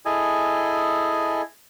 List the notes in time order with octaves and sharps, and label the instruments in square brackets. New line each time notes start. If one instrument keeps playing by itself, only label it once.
[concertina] E4 G#4 A4 D#5 G#5